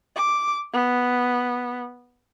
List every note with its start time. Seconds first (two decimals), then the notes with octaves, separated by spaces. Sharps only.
0.16 D6
0.73 B3